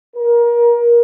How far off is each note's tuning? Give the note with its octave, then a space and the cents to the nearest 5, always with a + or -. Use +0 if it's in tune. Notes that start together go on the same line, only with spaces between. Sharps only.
A#4 +25